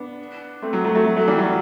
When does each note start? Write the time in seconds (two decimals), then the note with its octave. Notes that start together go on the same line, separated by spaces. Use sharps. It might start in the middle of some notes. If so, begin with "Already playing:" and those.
Already playing: B3 D4
0.62 A3 C4
0.73 F#3
0.84 F#3 A3
0.95 F#3 A3
1.05 F#3 A3
1.16 F#3 A3
1.28 E3 G3
1.38 F#3